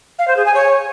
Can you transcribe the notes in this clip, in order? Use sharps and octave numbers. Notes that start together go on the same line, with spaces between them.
F5
C5
G#4
G#5
C#5